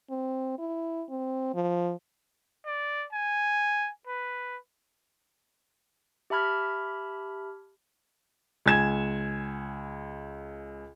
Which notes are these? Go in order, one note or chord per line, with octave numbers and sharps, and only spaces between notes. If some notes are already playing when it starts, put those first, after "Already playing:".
C4
E4
C4
F3
D5
G#5
B4
G4 E5 A5 B5 F6 G#6
C#2 G#5 G#6 E7